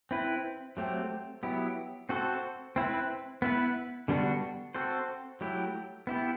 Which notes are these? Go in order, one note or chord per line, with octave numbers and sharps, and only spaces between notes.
C4 E4 B4
F#3 A3 C4 G4
F#3 B3 E4 G4
C4 F#4 A4 C5
C4 E4 B4
B3 E4 B4
D3 G3 B3 D4 F#4
C4 F#4 A4 C5
F#3 A3 E4 G4
B3 E4 G4